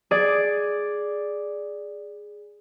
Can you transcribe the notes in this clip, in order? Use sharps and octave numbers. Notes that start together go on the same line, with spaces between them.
G#4 D5